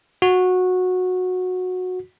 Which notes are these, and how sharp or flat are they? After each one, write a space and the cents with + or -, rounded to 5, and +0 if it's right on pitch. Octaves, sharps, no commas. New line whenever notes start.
F#4 -15